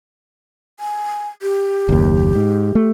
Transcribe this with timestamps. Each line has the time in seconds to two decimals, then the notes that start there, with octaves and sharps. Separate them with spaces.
0.80 G#5
1.42 G4
1.89 F#1 D#2
2.35 G#2
2.75 A3